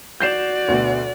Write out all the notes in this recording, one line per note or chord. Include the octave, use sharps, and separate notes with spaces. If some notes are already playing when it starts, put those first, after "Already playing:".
F#4 D5 G6 C7 E7
D2 B2 B3